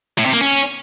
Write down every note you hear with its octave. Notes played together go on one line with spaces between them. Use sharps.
A2
C3
A#3
C#4